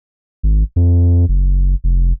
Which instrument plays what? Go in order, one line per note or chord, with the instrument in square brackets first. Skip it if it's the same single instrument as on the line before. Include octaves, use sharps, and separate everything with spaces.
[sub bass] G#1
F2
F#1
F1